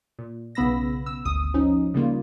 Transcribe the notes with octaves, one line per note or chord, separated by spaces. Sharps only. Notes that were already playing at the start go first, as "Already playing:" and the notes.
A#2
B1 C#3 B3 B5 E6 A#6
E6
G#1 D2 D#6
F3 C#4 D#4
C#3 G3 A#3 F4